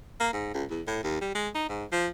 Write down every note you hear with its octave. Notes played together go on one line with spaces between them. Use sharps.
A#3
G#2
C#2
E2
A2
D#2
G3
G#3
D#4
G#2
F3